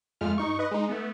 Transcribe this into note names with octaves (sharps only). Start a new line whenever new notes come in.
F2 G#3 A3 F4 F6
G2 D#4 C#6
B4 D#5
G#3 D#4
A3 B3